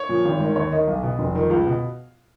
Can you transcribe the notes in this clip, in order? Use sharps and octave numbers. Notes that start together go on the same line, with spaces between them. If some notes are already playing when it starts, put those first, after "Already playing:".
Already playing: C#5
A#2 F3
G#1
G#2 D#3
D#2 C#5
D#3 D#5
B1
B2
F1
F2 D#3
C#2 F5
B2